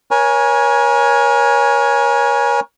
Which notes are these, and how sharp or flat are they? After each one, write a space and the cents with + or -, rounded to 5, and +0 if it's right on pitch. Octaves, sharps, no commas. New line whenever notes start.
A#4 +35 C#5 +0 G#5 +0